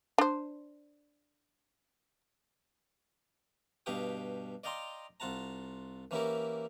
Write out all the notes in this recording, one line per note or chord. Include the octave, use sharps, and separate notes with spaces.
D4 C5
G2 B2 G4 F5 G5 D#6
D5 D#5 F5 G5 A#5 C6
C2 F4 F#5 A5 A#5
E3 A#3 C#4 E4 G4 A#4